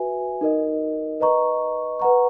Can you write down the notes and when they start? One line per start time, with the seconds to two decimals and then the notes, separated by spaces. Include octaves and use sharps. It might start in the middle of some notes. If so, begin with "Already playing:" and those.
Already playing: F#4 B4 E5 G#5
0.41 D#4 A#4 D#5
1.20 B4 D#5 A#5 C#6
1.99 B4 F#5 A#5 C#6